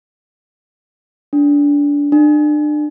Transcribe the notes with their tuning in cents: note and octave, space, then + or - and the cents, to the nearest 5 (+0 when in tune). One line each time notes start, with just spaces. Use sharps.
D4 -25
D4 +30